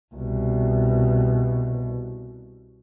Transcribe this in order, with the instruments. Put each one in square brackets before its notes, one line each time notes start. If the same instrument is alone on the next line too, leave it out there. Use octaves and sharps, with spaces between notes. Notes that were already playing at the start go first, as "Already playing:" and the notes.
[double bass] C2 B2